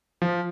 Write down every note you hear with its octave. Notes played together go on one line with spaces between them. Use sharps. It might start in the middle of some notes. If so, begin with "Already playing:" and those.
F3